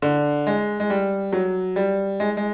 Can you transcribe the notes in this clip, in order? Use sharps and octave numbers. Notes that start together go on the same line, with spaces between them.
D3
G#3
G#3
G3
F#3
G3
G#3
G#3